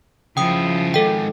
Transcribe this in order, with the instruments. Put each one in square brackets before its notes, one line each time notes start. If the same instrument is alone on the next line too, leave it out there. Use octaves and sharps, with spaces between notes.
[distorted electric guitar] C#3 E4 [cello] F3 [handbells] G5 D#6
[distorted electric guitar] G#2 D#3 [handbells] A4 G5